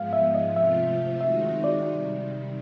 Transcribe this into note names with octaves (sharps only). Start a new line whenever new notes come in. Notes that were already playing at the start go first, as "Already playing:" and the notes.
Already playing: G#2 F3 G#3 B3 F5
E5
D#5
C3 F3 A3 C4 F4 E5
D#3 G#3 C4 D#4 F#4 E5
D5
C3 D#3 G3